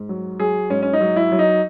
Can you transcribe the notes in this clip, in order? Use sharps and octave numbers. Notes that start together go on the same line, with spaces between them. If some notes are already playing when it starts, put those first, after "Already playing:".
Already playing: G#2
F#3
F#3 G#4
G#2 C#4
C#4
D#4
F#3
E4
F#3
D#4